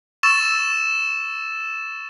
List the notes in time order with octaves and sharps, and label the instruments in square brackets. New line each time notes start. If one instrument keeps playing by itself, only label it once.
[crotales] C#6 E6 A6 E7